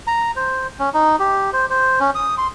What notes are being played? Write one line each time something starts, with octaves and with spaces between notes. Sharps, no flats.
A#5
C5
C#4
D#4
G4
C5
C5
C#4
D#6
C6